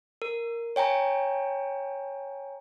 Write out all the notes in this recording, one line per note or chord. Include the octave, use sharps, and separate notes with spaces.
A#4
C#5 G5 G#5 A#5